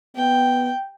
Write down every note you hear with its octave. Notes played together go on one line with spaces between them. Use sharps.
B3 G5